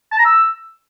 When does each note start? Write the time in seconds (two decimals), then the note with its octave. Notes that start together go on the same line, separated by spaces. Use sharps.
0.12 A5
0.19 A#5
0.25 E6